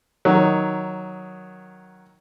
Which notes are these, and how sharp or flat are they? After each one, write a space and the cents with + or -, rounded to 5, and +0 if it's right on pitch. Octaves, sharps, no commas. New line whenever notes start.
D#3 +0 F#3 +0